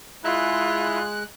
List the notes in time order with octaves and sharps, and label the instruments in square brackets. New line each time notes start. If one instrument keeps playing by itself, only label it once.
[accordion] G#3 F#6 [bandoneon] E4 [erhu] F4